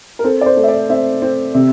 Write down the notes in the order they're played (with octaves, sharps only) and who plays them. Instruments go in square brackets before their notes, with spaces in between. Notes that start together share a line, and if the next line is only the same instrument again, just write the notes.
[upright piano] A#4
C4 A4
D5
C5
A3
E5
D5
C4 E5
C4
C3